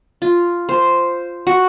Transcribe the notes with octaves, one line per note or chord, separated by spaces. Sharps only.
F4
C5
F#4